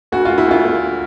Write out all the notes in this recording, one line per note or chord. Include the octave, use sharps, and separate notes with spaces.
D2 F#4
D2 F4
E4
D2 F4
D2